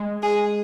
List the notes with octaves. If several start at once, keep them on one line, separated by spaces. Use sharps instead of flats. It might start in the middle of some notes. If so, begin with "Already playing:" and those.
Already playing: G#3
G#4